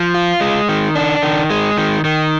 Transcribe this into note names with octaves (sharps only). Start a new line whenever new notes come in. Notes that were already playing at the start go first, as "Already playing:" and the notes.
Already playing: F3
F4
G#3
D#3
D4
D#3
G#3
D#3
D#3